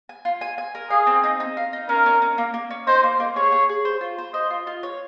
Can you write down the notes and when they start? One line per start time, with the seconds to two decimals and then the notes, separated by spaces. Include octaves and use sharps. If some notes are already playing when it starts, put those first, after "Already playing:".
0.09 G#5
0.25 F4
0.41 G#5
0.58 G#5
0.75 A#4
0.90 G#4 F5
1.07 C4
1.24 D#4
1.40 D#4
1.57 F5
1.73 D#4
1.89 C#4 A#4
2.06 C#4
2.22 C#4
2.38 A#3
2.54 A#3
2.70 C#4
2.87 D#4 C5
3.03 A#3
3.20 A#3
3.36 G#4 C#5
3.52 G#4
3.69 G#4
3.85 C5
4.01 F4
4.18 C5
4.34 C5 D#5
4.50 F4
4.67 F4
4.83 C#5